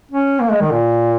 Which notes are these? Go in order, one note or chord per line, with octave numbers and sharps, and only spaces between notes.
C#4
A#3
G#3
D#3
A#2